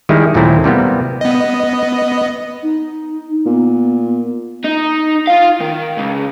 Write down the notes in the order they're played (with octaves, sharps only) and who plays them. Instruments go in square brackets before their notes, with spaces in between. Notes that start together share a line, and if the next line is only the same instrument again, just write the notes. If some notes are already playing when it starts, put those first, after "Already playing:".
[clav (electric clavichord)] D#3 G3 G#3 E4
D#2 A#2 F#3 A3 C4 E4
C3 G3 A#3 B3
[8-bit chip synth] B3 D#5
[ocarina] D#4
[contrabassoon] A#2 [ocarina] B3
[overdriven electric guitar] D#4
F4 F5
D#3
C#2